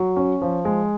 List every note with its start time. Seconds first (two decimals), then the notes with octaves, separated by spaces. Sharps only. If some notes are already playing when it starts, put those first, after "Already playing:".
Already playing: F#3
0.16 C#4
0.42 F3
0.65 G#3